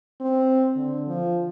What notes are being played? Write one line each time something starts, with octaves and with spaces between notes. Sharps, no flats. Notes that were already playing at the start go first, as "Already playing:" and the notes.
C4
D3
F3